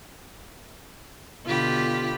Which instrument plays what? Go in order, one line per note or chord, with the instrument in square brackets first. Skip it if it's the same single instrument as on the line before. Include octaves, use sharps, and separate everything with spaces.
[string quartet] B2 D3 F4 G4 B5